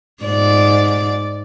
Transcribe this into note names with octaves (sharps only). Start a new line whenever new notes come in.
G#2 D5